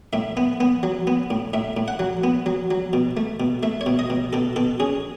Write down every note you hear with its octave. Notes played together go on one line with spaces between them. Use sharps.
A2 E5
B3
B3
F#3
B3
A2
A2 E5
A2
F#5
F#3
B3
F#3
F#3
B2
A3
B2
A3 E5
C#5
B2
D#5
B2
B2 A4
B2 A4
C#4 G#4